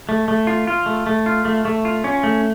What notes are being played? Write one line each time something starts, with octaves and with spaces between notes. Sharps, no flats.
A3
A3
F4
F4
A3
A3
F4
A3
A3
F4
C#4
A3